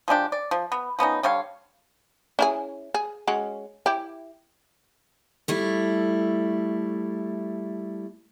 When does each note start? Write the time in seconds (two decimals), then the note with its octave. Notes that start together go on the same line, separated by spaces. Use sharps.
0.08 F3 G#3 D4 G4
0.32 D5
0.51 F3
0.72 B3
0.99 F3 B3 C#4 D#4
1.23 D3 G3 C#5 F5
2.39 C#4 E4 G#4
2.94 G#4
3.27 G#3 C#4 F#4
3.86 E4 G4
5.48 G3 A3 E4